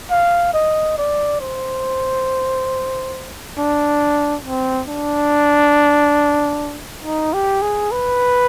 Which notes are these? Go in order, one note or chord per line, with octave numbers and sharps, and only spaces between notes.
F5
D#5
D5
C5
D4
C4
D4
D#4
G4
G#4
B4